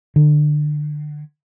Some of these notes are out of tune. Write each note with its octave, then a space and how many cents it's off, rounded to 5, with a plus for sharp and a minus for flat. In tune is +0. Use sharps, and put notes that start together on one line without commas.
D3 +25